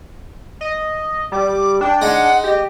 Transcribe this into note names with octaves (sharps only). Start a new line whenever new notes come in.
D#5
G3 D6
D4 G5
G#3 D#4 F#5
G4 D#5